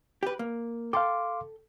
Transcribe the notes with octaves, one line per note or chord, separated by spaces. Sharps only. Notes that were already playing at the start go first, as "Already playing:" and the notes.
G4 B4
A#3
A4 F5 G5 C6 D6